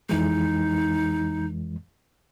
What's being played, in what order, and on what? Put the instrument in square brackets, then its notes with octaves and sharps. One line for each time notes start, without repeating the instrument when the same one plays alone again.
[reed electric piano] F2 E3 G#3 [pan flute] D#4